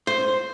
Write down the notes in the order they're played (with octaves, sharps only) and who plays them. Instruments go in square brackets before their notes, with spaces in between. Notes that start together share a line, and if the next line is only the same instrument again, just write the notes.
[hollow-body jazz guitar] C5